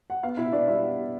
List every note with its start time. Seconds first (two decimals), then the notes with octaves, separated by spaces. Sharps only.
0.10 F#5
0.23 B3 F5
0.37 B2 E4 E5
0.52 B2 D4 D5
0.68 G3 E4 E5
0.83 B3
0.98 B2